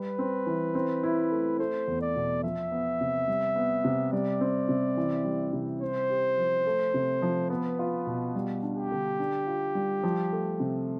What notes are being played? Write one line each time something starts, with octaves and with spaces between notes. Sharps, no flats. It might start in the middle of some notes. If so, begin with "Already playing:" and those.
Already playing: G3 B4
C4
E3
C4
E4
A3
A3 C5
E2
D5
B2
F3 E5
B3
C3
G3
B3
C3
G3 D5
C4
C3
E3
G3
C3
C4 C5
G4
F3
A3
C3
F3
B3 B4
F4
B2
G3
D4
G4
D3
D4
F4
G3
F3
A3
C3